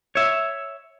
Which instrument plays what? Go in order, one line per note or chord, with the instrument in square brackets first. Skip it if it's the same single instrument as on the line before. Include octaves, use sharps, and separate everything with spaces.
[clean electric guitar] C#5 E5